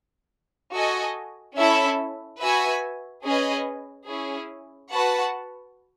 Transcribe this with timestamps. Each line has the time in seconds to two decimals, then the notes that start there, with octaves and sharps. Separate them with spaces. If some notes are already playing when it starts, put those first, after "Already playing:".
0.73 F#4 A4 D#5 G#5
1.57 C#4 E4 A4 E5
2.41 F#4 B4 E5 G#5
3.24 C#4 G#4 B4 D#5 G#5
4.07 C#4 E4 G#4
4.92 F#4 B4 F#5 A5